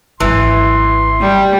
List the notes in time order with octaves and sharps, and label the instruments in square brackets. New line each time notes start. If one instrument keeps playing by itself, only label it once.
[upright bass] G#1 F#3 [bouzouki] E3 [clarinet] C6
[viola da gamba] G3